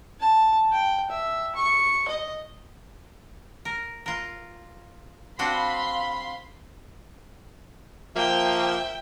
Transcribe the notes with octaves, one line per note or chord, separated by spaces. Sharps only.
A5
G5
E5
C#6
D#5
A#4
F4 A#4
C4 D4 F#4 F5 B5 C6
F3 A#3 E5 G5